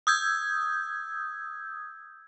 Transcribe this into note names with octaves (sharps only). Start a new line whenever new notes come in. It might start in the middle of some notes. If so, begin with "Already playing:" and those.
D#6 E6 G6 G#6